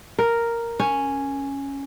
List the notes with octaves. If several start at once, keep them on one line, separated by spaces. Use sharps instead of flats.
A#4
C#4